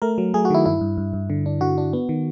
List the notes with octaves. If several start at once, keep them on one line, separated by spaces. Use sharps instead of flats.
A3 A#4
F#3
A3 G#4
F#4
D#3 E4
G2 E4
G2
G2
G2
D3
D4
D3 F#4
D4
B3
D#3